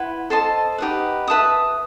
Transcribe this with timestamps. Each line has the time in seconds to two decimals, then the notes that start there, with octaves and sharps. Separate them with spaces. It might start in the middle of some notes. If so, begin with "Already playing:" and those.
Already playing: E4 B4 F#5 C6
0.30 A4 C5 D#5 A5
0.78 D#4 G4 B4 F#5
1.28 B4 E5 A5 D#6